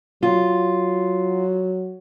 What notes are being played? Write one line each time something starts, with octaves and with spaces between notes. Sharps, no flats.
F#3 F4